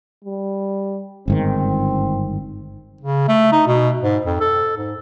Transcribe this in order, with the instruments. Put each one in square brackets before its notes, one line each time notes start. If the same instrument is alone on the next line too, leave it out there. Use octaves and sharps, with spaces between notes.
[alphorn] G3
[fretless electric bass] G1 G#2 D#3 [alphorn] C4
[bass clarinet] C#3
A3
D#4
B2
G#2
F2
A4
G#2